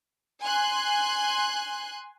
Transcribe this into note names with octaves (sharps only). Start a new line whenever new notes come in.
G#5 C6 F#6